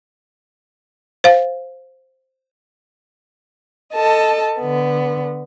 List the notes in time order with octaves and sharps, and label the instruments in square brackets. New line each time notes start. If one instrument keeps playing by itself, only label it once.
[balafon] C5 F5
[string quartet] A4 D#5 A5
D3 B3